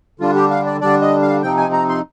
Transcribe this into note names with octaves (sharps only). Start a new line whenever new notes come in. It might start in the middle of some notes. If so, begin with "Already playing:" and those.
D3 G3 D4 F4
G4
F5
D5
D3 G3 D4 D5
D#5
F5
C3 F3 C4 D#4 G5
G#5
A#5
C6